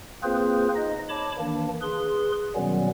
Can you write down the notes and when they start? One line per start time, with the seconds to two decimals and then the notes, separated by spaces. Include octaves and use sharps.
0.23 A#3 C4 F4 G#4 B4 C5
0.75 D#4 D#5
1.09 C#5 A5 B5 D6
1.39 D#3 E3 A#3 D4
1.82 G#4 B4 C6
2.56 B2 D#3 F#3 G3 B3 C#4